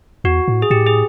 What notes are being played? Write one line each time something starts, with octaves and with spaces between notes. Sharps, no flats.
E2 F#4
A2
G#4
A2 G4
G#4